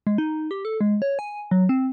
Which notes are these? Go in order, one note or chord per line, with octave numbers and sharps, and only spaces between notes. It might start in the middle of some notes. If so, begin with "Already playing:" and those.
G#3
D#4
G4
A4
G#3
C#5
G#5
F#3
C4